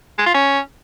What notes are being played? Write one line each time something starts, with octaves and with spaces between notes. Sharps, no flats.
G#3
F4
C#4